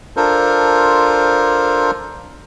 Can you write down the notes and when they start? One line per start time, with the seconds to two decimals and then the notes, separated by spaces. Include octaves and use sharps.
0.17 D4 F4 A4 A#4 C5